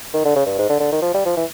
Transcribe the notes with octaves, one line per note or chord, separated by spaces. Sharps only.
D#3
D3
C#3
G2
G#2
D3
D3
D#3
F3
G3
F3
E3